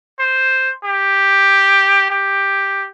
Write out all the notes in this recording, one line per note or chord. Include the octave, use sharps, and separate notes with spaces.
C5
G4
G4